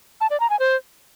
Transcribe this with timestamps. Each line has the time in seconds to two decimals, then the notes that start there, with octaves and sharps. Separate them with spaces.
0.21 A5
0.30 D5
0.40 A#5
0.50 G#5
0.60 C5